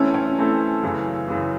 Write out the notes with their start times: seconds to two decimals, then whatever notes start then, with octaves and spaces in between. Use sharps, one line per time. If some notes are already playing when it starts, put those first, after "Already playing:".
Already playing: E3 A3 C4 C#4 E4 A4
0.14 C#4
0.38 E3 A3 C4 E4 A4
0.83 F#2 C#3 E3
1.28 F#2 C#3 E3